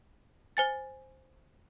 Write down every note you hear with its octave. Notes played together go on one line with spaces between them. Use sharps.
C5 G#5 A6